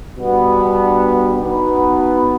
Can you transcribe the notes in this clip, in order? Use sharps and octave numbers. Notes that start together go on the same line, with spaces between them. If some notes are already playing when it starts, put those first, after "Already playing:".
B2 G3 B3 D4
B2 B3 D#4 B4